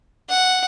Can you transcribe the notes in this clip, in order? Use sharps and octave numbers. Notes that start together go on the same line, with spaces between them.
F#5